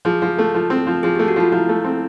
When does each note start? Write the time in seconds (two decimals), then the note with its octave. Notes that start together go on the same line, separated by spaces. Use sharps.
0.05 F3 G#4
0.22 F3
0.38 A3
0.55 F3
0.70 C4
0.87 F3
1.03 F3 G#4
1.16 A3 G4
1.28 F#4
1.36 F3 F4
1.52 F3 E4
1.69 A3
1.85 C4